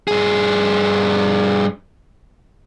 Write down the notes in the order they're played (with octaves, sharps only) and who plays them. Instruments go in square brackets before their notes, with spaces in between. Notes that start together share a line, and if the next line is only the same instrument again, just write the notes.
[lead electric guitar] G2 G#4